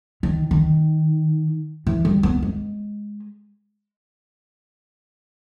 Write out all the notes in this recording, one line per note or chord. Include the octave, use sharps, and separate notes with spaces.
D#3
D#3
E3
G3
B3
G#3